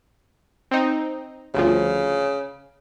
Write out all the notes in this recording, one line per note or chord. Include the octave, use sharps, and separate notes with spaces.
C4 D#4
G1 D2 C#3 F3